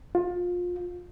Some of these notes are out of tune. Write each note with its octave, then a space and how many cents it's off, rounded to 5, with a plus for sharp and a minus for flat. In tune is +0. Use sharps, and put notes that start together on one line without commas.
F4 +25